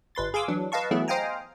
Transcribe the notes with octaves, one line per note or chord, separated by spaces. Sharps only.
G1 B4 C6 A6
G#4 F5 G#5 C6 D6 E6
E3 F#3 D4
B4 D#5 F5 A5 C#6
E3 F#3 A3 B3 E4 G#4
C5 D#5 F5 G5 G#5 A#5